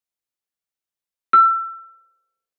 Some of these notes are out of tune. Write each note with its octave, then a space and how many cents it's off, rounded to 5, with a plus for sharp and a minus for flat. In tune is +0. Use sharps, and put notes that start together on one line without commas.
E6 +30